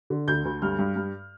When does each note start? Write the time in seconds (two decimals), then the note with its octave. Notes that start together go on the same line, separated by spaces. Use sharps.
0.10 D3
0.28 D2 G6
0.45 D2
0.62 G2 F6
0.79 G2
0.96 G2